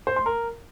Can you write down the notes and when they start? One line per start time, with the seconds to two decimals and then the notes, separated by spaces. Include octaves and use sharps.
0.07 C5
0.16 C6
0.26 A#4